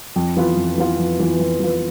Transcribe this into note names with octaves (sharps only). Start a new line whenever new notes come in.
F2
E3 B3 F4 B4
F2
E3 B3 F4 B4
F2
E3 B3 F4 B4
F2
E3 B3 F4 B4